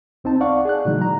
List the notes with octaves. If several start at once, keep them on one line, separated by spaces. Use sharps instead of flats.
C2 C4 D#4 A5
D5 F5 F#5 C#6
G#4 D5 F#6
A#2 D3 E3 F#3 G#3 D#4
A#5